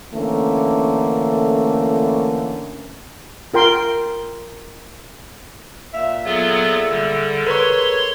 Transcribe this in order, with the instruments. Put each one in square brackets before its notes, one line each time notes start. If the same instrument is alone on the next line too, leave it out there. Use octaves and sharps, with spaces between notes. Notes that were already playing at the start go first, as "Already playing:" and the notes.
[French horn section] D3 E3 A3 A#3 C#4
[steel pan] F4 A#4 G5 C6
[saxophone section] A#2 E5 [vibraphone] F5 E6
[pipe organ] F#3 B3 F4 [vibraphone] G#4 A4
[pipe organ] D3 G3
[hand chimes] A#4 C#6 [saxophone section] B4 [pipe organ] C#5 C6